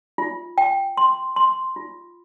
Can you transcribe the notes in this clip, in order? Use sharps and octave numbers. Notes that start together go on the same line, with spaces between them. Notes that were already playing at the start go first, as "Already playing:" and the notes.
F4
G5
C6
C6
F4